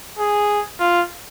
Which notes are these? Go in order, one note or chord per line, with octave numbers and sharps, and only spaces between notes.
G#4
F4